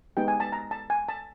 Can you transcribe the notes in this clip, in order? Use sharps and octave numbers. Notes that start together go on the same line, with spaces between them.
G#3 B3 D#4 G4 G5
G#5
A5
A#5
A5
G#5
A5